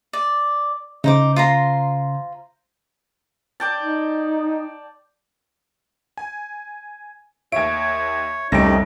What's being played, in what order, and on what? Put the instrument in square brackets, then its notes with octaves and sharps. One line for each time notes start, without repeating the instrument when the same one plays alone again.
[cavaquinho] D5
[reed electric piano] C#3 [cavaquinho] D#4 C5 D6
[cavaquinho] F4 C5 A#5
[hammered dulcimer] D5 G5 A5
[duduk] D#4
[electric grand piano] G#5
[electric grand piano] D#2 D7 [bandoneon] C#5 [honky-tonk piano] E5 G#6
[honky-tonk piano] F1 [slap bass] C2 [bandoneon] C#4 D#4 G4 [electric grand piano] A#6 D7